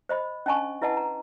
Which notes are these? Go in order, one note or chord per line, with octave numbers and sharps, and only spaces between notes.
C5 D#5 B5
C#4 D4 D#5 G#5 A5 C#6
E4 B4 D#5 F#5 A5
A#5